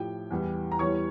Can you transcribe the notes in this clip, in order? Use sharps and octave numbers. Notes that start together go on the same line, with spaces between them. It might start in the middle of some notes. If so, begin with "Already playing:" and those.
Already playing: A2 F3 G4 G5
E2 E3 G3
A#5
E2 E3 G3 C#5 C#6